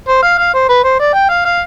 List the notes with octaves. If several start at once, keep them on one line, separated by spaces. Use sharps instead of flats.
C5
F5
F5
C5
B4
C5
D5
G5
F5
F5